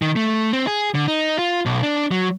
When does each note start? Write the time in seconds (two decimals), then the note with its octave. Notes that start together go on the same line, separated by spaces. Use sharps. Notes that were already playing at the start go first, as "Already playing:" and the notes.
0.02 D#3
0.16 A3
0.53 C4
0.67 G#4
0.95 D3
1.08 D#4
1.39 F4
1.66 B1
1.83 D4
2.11 F#3